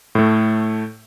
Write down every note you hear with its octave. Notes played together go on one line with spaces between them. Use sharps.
A2 A3